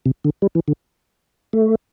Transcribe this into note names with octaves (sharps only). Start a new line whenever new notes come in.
C3
D3
G3
E3
D3
A3